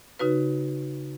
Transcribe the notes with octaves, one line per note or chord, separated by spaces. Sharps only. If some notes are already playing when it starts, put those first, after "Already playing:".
C#3 D#4 F#4 B4